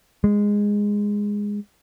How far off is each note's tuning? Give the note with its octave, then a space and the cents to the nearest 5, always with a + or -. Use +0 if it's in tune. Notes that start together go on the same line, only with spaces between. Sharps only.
G#3 -10